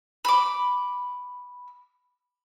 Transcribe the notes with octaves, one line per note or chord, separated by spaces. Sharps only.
B5 D6